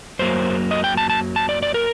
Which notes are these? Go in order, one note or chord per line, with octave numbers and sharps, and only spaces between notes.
F#2 F#3 A#3 C5
D#5
G5
A5
A5
A5
D5
D5
A#4